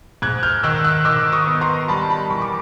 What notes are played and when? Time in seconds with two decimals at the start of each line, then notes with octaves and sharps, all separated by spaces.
0.22 G#2 F#6 G#6
0.43 F6 G6
0.63 D#3 E6 F#6
0.84 E6 F#6
1.05 D#3 D6 E6
1.33 C#6 D#6
1.47 B3
1.61 A#5 C6
1.88 G3 A5 B5
2.10 A5 B5
2.30 E3 B5 C#6
2.42 D6